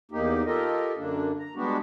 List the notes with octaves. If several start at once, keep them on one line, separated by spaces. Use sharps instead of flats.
E2 A#3 D#4 G4
F4 G4 A4 A#4 D#5
F#2 D3 A#3 D4
A#5
G3 G#3 B3 D4 F#4 G4